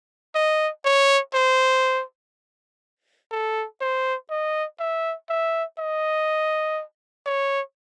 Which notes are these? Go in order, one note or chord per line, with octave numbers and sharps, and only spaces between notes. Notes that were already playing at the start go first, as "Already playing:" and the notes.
D#5
C#5
C5
A4
C5
D#5
E5
E5
D#5
C#5